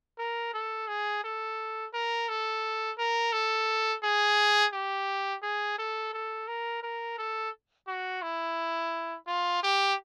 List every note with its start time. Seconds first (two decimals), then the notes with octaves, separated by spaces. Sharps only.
0.19 A#4
0.53 A4
0.88 G#4
1.24 A4
1.94 A#4
2.29 A4
2.98 A#4
3.33 A4
4.03 G#4
4.73 G4
5.43 G#4
5.78 A4
6.13 A4
6.48 A#4
6.83 A#4
7.18 A4
7.88 F#4
8.22 E4
9.27 F4
9.63 G4